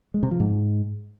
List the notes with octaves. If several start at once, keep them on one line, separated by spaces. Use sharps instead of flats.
G#3
C3
F3
G#2